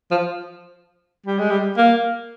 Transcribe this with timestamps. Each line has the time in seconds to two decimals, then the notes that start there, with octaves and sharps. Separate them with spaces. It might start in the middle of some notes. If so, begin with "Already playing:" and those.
0.11 F3
1.26 G3
1.39 G#3
1.50 G3
1.77 A#3